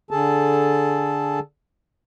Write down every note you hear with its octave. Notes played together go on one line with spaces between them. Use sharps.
D3 G#4 A4 A5